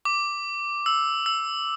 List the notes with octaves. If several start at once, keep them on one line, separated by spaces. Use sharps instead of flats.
D6
E6
E6